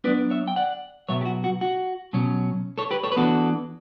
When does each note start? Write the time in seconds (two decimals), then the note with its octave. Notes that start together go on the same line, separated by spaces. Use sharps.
0.04 F#3 B3 D4 B4 D5
0.30 C#5 E5
0.48 G5
0.56 D5 F#5
1.09 B2 F#3 B3 C#5 E5
1.21 G4
1.25 F#4
1.44 F#4
1.61 F#4
2.13 B2 F#3 C#4
2.78 A4 C#5
2.91 G4 B4
3.04 A4 C#5
3.12 B4
3.16 E3 B3 D4 F#4 A4